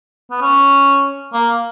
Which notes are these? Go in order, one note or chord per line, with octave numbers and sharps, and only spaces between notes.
B3
C#4
A#3